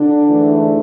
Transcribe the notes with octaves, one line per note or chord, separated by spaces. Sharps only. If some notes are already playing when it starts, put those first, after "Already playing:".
Already playing: D3 D4
G#2 E3 A3